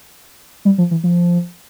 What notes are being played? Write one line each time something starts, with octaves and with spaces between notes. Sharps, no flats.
G3
F3
E3
F3